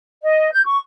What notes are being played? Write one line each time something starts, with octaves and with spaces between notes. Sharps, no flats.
D#5
G6
C#6